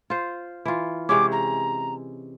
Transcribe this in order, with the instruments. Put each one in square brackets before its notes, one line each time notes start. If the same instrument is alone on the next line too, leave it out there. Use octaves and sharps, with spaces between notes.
[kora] F4 C5
E3 F4
[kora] C3 G#3 C#4 [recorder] D6
[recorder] A#5